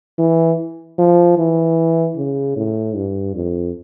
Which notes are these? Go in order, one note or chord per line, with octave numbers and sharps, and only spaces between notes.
E3
F3
E3
C#3
A2
G2
F2